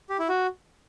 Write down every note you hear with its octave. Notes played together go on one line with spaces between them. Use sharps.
G4
E4
F#4